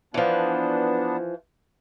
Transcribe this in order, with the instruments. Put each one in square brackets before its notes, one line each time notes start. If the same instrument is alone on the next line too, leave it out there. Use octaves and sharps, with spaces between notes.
[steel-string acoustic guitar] E3 F3 [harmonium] B3 D4